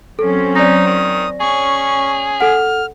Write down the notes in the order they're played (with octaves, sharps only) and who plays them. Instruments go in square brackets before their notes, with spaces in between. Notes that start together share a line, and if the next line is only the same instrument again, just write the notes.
[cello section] F#3 C4 C#4 [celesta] A4
[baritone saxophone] D#4 [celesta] D5 A#6 [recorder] D#6
[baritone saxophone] D#3
[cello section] C#4 [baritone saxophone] G#4 [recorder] C#6
[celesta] A4 F#5 [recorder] F6